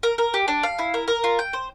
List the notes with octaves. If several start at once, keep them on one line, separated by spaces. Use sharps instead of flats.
A#4
A#4
G4
D4
F5
E4
A#4
A#4
F4
G5
C5